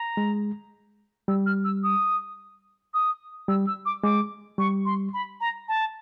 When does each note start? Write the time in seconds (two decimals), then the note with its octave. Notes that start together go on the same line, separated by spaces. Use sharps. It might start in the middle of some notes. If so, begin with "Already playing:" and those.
Already playing: A#5
0.17 G#3
1.28 G3 E6
1.46 F6
1.64 E6
1.83 D#6
2.94 D#6
3.48 G3 E6
3.67 E6
3.85 D6
4.03 G#3 D6
4.58 G3 C#6
4.85 C6
5.13 B5
5.40 A#5
5.68 A5